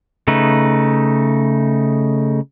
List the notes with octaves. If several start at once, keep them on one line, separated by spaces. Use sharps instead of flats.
C#3 A3 D#4 B4